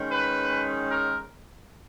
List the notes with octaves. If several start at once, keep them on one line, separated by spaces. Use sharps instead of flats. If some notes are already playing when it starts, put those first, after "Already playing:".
Already playing: D#3 G#3 C#4
B4
A#4